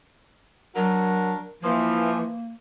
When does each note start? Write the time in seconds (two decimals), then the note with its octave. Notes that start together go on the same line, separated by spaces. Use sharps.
0.76 F#3 D4 F#4 A#4
1.63 E3 F3 A#3